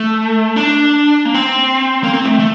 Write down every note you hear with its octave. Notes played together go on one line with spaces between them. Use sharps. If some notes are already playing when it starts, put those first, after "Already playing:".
Already playing: A3
D4
A#3
C4
A#3
C4
A3
A3